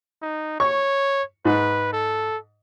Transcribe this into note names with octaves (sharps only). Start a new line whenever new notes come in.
D#4
C#5 C#6
G#2 B4
A4